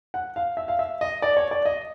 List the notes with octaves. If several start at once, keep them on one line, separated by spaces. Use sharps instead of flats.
F#5
F5
E5
F5
E5
D#5
D5
C#5
D5
D#5